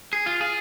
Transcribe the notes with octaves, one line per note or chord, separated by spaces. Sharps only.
G#4
F4
G#4